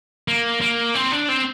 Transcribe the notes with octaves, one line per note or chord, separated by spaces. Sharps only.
A#3
A#3
C4
D4
C4